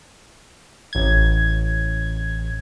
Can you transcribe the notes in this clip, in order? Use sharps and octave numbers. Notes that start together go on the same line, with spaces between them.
A1 G#6